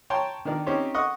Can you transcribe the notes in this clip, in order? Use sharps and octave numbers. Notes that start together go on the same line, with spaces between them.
C#5 G5 A5 A#5 C6
D#3 D4 A#4 D5
C4 C#4 D#4 G4 C5 C#5
D#5 F#5 C#6 D#6